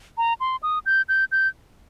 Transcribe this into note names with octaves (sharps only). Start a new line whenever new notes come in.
A#5
C6
D#6
G6
G6
G6